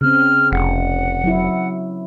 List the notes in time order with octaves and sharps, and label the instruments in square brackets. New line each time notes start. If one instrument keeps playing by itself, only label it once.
[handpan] C#3 C4 [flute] F6
[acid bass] F1 [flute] F#5
[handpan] F#3 E4